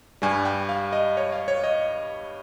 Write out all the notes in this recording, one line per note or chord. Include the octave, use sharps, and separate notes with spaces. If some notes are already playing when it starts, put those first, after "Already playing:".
G2 G3 G#5
G5
F5
D#5
C#5
F5
C#5
D#5